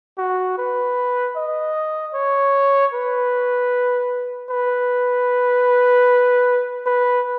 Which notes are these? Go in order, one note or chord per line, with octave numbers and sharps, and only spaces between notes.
F#4
B4
D#5
C#5
B4
B4
B4